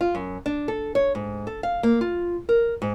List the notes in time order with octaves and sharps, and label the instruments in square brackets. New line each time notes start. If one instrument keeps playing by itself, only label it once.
[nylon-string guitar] F4
F#2
D4
A4
C#5
G#2
A4
F5
A#3
F4
A#4
G#2